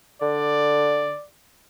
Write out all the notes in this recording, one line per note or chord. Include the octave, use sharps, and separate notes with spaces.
D3 D5